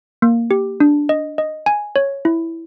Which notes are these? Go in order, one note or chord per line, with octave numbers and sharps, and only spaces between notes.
A#3
G4
D4
D#5
D#5
G#5
C#5
E4